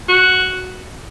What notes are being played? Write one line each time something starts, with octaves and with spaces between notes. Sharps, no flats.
F#4